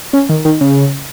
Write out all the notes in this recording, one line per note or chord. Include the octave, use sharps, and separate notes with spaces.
C#4
D#3
D#3
C#3